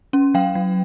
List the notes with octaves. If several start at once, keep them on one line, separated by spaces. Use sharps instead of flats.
C#4
F#3 F5 G5
F#3